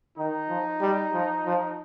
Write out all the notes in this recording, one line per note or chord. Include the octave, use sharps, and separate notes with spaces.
D#3 D#4
F3
G3
F3
F3